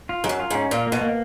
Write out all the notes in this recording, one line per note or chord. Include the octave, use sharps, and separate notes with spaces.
F4
G#2 F#3
F#2
F4
G#2 C#4
A#2 F4
A#3
B2
A#3